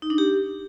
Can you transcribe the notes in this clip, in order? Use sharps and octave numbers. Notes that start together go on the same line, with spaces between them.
D#4
D4
G4